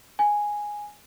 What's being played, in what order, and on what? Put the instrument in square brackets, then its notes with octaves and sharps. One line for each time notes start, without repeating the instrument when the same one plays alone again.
[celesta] G#5